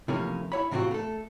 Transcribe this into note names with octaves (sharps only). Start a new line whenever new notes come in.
C3 E3 F3 A3 A#3 C#4
E4 C#5 B5
A2 C3 E3 C4 F4 F#4
A3 A4